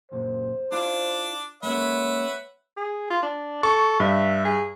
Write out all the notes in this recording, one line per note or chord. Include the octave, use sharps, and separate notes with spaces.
C#2 F#2 A#2 C5
D4 E4 F4 F5
G#3 A#3 C#4 B4 C#5 E5 F#5
G#4
F4
D4
A4 C#6
G2 E5
G#4